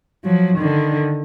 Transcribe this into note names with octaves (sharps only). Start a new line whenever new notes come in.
F3 F#3
D3 D#3